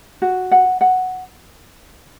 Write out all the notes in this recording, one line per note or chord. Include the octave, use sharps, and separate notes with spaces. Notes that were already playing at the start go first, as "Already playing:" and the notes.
F#4
F#5
F#5